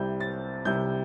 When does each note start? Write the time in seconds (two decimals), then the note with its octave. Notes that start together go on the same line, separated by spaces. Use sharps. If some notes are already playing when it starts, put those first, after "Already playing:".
Already playing: C2 C3 G3 G6
0.20 A6
0.65 C2 C3 G3 G6